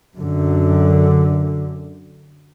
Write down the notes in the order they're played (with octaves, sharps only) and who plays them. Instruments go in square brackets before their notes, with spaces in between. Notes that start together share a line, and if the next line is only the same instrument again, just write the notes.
[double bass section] F#2 D3